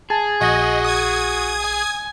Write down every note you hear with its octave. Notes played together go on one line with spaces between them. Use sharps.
G#4 A5
A#1 F#4 D#5
D#6 G#6
G#5